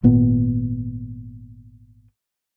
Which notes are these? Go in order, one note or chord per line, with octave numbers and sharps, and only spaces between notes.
G#1 A#2 B3